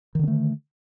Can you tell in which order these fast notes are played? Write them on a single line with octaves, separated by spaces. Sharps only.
D#3 D3 C4 A3